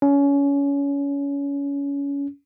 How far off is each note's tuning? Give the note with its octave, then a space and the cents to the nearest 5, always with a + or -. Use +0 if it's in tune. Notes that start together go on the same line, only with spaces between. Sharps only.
C#4 +25